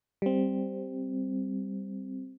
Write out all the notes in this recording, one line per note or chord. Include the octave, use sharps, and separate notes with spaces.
G3 C4